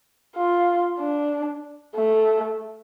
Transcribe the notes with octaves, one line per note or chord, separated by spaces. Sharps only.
F4
D4
A3